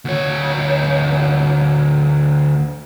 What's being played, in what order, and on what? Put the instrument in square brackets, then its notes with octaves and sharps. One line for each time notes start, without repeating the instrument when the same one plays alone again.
[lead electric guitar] D2 C#5